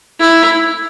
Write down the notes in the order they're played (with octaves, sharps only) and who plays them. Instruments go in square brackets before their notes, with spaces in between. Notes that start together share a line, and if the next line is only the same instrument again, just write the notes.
[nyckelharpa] E4